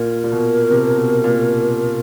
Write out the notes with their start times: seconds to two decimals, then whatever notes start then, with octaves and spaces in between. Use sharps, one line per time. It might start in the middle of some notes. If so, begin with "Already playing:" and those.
Already playing: A#2 A#4
0.24 A#2
0.32 B2
0.70 C3
0.97 B2
1.24 A#2